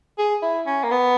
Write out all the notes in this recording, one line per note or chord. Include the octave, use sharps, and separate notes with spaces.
G#4
E4
C#4
A#3
B3